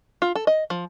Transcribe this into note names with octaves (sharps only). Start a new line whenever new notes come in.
F4
A4
D#5
F3